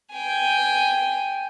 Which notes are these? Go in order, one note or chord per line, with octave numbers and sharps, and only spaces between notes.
G5 G#5